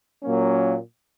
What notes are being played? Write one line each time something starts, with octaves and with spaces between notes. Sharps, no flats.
A#2 F#3 A#3 C#4